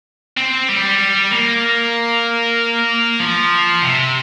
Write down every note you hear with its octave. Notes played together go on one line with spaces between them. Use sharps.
C4
G3
A#3
F3
C3